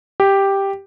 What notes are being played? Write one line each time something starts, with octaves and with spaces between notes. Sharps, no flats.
G4